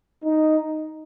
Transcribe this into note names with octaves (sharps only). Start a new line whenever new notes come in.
D#4